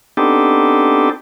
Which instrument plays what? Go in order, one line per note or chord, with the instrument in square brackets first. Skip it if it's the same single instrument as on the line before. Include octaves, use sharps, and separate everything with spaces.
[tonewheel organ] B3 C4 D4 D#4 G4 A4